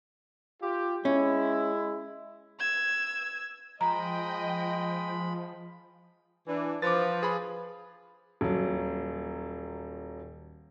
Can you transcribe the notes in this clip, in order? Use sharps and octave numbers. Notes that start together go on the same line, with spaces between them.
F4 G4
G#3 C#4 E4
E6 G#6
F3 G#3 D#5 G5 A#5 B5
E3 D4
F3 B4 D6 A6
G#4 B5
D#1 F#3